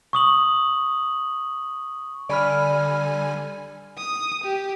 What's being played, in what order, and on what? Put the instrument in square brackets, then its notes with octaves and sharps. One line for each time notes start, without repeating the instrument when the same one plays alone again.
[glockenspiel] C#6 D#6 F#7
[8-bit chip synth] D3 G3 G#5 [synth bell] D5 B5 F6
[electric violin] D#6
G4